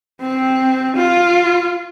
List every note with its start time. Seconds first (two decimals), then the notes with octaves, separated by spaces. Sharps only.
0.21 C4
0.97 F4